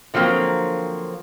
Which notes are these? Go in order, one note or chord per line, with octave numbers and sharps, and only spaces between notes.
D3 F3 F#3 A#3 C4